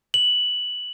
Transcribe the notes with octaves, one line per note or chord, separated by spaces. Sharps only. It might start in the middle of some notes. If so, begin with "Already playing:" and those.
F#7